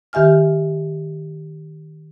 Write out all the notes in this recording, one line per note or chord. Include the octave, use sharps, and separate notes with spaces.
D#3 G4 E5 G#5 F6